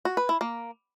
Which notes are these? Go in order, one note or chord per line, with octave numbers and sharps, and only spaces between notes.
F#4
B4
E4
A#3